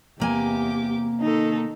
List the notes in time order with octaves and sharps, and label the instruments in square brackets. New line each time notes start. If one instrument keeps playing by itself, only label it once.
[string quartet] E2 G4 D6 [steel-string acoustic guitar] C3 A#3 G#5
[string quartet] D#3 D#4 A4